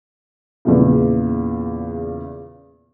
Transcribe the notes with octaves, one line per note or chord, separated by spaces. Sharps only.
E2 A#2 C#3